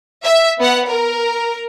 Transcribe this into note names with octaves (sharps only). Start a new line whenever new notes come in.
E5
B3 F#5
A#4